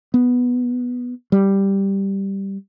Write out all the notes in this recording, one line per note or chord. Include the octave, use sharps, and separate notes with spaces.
B3
G3